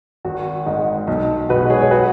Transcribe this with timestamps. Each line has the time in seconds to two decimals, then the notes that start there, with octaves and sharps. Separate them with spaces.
0.25 G#1 F#4
0.66 G#2 D#3 D#4
1.07 B1 D#4
1.49 B2 G#3 F#4 B4
1.70 G#4 C#5
1.82 C#5
1.91 F#4 B4